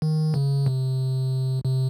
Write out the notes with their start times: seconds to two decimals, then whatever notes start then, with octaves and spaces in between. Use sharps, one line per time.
0.02 D#3
0.34 C#3
0.66 C3
1.64 C3